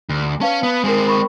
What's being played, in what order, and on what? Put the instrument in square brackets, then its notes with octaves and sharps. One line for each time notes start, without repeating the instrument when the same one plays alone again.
[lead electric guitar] D2
[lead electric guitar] C#4 [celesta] B4 F5 A5
[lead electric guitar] B3
[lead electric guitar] G#3 C4 [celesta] A#4 G#5
[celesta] A#4 B5 C#6